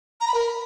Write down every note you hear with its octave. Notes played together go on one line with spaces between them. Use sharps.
A#5
B5
A#4